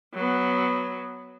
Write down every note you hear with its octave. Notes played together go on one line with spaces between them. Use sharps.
F#3 B3